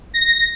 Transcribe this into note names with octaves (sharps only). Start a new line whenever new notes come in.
A#6